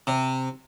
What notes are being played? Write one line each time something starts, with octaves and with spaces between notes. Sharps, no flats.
C3